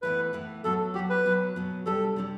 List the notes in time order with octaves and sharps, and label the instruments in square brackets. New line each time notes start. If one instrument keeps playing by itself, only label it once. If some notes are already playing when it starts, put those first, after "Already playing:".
[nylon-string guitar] A2 E3 B3 [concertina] B4
[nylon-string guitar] A2 E3 B3
[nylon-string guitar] F#3 B3 F#4 [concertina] A4
[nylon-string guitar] F#3 B3 F#4 [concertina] G4
[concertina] B4
[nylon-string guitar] B2 F#3 B3
B2 F#3 B3
[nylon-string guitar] C3 G3 D4 G4 [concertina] A4
[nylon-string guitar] C3 G3 D4 G4